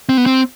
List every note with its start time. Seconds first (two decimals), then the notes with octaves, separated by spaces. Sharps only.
0.09 C4
0.17 B3
0.26 C4